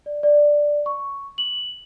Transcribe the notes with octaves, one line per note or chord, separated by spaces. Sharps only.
D5
D5
C#6
F#7